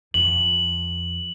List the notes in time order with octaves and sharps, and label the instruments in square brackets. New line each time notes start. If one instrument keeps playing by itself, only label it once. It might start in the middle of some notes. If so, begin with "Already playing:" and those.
[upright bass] F2 [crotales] F#7